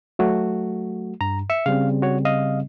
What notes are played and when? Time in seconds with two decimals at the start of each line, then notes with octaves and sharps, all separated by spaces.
0.19 F#3 A3 F#4
1.21 G2 A#5
1.50 E5 C#7
1.66 C#3 G3 C4 F5
2.02 F#4 C#5
2.25 D#5 F5